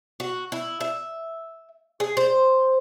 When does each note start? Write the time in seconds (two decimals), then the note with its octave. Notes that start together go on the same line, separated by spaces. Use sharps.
0.20 F#4
0.52 E4
0.81 E5
2.00 G#4
2.17 C5